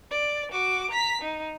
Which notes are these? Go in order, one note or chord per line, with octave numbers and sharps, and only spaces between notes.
D5
F#4 D6
A#5 B6
D#4